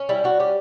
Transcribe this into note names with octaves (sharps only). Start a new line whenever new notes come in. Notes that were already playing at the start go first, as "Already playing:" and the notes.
Already playing: C#4
G3 E4
G3 F#4
C#4 G4